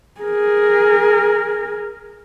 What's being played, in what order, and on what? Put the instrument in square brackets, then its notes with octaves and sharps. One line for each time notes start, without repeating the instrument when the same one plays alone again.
[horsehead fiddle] G#4 A#4